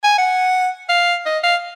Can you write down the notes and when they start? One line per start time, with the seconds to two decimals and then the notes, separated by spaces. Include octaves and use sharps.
0.03 G#5
0.18 F#5
0.89 F5
1.26 D#5
1.43 F5